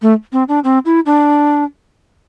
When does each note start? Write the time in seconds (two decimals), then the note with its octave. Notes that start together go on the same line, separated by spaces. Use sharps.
0.02 A3
0.33 C4
0.49 D4
0.64 C4
0.85 E4
1.06 D4